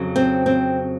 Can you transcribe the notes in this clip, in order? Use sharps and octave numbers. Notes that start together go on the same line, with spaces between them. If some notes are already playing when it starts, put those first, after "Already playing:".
Already playing: F2 C#3 F#3
C4
C4